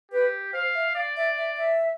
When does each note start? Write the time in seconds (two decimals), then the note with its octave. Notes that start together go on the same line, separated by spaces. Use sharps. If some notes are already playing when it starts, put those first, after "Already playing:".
0.12 G4 B4
0.53 C5 F5
0.75 E5
0.95 D5 F5
1.17 E5
1.37 E5
1.57 E5